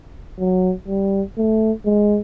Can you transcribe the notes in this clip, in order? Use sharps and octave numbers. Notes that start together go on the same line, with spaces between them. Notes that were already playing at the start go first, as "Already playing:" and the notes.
F#3
G3
A3
G#3